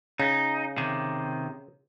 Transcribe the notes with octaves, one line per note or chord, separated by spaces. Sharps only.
C#3 D#4
C3 D#3